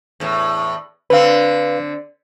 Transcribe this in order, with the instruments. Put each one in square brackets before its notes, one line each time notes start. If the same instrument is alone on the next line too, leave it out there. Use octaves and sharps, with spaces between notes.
[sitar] E2 A2
[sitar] D3 C4 [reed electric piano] B4 F5